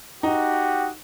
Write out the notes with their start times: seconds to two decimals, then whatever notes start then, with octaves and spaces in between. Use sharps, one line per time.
0.23 D#4 F#4 G4